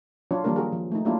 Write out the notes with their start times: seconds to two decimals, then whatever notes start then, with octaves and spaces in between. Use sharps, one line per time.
0.31 F#3 D4 F4 C#5
0.44 D#3 F3 G3 A#3 D4 A#4
0.56 F#4 G#4 A#4
0.72 F3
0.92 A3 D#4
1.05 F#3 A#3 D4 E4 F4 G4